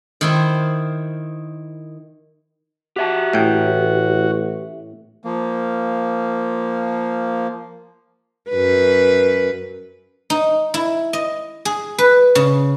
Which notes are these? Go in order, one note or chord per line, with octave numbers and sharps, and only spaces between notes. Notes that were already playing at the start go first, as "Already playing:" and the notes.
D#3 E4 C5
F#4 G4 E5 A5
A1 A2 G5
F3 A#3
F#2 B4
D#4
E4
D#5
G#4
B4
C#3